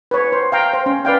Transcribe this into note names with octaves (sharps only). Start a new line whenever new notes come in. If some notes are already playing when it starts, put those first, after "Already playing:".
B4 C#5
C5
F5 G5 A#5
C5
C#4
B4 D5 F5 G5